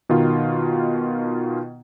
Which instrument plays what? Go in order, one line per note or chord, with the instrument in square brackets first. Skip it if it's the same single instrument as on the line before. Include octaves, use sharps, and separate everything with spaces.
[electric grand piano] B2 D#3 F4